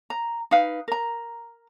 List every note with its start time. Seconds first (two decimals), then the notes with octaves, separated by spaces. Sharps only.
0.10 A#5
0.51 D#4 B4 F5
0.88 A#4 A#5